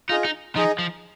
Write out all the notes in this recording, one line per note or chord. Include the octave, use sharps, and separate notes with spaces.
D#4 F4 G#4 D#5
D#4
F3 D#4 G#4 D#5
F3